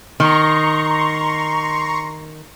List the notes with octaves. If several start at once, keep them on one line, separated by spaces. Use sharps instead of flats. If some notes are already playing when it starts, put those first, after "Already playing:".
D#3 A#5 C6 C#6